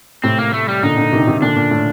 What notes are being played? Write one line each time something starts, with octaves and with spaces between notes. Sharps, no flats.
A2 C3 C4
A#3
A3
G3
A#2 D3 D#4
A#2 D3
C3 D#3
D3
C3 D#3
A#2 D3 D4
A#2
A2